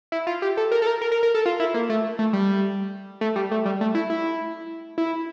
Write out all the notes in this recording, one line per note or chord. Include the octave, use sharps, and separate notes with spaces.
E4
F4
G4
A4
A#4
A4
A#4
A#4
A#4
A#4
A4
F4
E4
A#3
A3
A3
G3
A3
G3
A3
G3
A3
E4
E4
E4